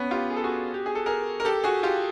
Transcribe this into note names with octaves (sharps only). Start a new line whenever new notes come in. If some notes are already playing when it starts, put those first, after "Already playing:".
Already playing: B3 C#4
F4 G4
G#4
A4
F#4 G#4
G4
G#4
A4
G#4 A#4
A#4
G4 A4
F#4 G#4
F4 G4